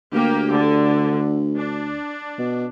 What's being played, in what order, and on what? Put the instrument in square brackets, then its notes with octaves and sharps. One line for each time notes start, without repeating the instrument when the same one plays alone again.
[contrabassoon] D2 [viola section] A#3 G4
[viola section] D3
D4
[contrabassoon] B2